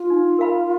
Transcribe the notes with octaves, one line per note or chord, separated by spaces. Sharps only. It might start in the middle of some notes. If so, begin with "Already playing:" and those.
Already playing: F4
D#4
A#4 F5 B5